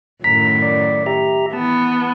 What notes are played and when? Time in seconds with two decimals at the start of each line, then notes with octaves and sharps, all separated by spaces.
0.24 F#2 A2 D#3 A#5 B6
0.62 D5
1.06 G4 E5 A#5
1.53 E3 B3 A5